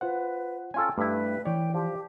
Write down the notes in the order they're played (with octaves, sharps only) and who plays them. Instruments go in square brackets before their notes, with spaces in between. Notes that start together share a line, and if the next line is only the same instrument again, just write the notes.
[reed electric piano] F4 C5 F#5 [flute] B4
[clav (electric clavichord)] C#4 F4 A4 [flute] G5 [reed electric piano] G#5
[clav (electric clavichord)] G2 E4 [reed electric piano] A3 B5 [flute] B4
[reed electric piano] E3 D5 [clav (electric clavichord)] C#5 [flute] G5
[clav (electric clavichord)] F3 [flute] G4